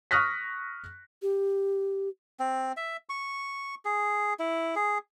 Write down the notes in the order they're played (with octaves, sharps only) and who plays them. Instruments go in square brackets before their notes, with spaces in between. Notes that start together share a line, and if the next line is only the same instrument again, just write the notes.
[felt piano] C#6 D#6 F6 F#6 A#6 B6
[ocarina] G4
[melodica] C4
E5
C#6
G#4
E4
G#4